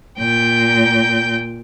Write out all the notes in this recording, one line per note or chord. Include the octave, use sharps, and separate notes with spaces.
A#2 G5 G6